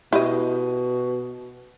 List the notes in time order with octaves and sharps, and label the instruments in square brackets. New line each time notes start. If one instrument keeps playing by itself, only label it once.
[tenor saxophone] B2 [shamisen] E4 G4 D#5